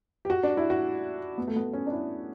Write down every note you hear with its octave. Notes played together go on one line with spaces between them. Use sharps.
G4
F#4
D4
E4
F#4
B3
A3
B3
C#4
D4
E4